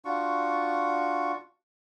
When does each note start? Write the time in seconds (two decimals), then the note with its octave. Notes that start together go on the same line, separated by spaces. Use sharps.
0.05 D4 F4 F#4 C#6